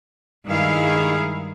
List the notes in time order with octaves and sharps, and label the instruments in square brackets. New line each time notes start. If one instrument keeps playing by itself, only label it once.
[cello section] G2 D#3 G#3 E4 G#4 F5